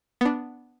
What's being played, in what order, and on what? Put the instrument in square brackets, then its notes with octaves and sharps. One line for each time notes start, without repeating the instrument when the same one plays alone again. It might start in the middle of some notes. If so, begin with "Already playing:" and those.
[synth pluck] B3 D4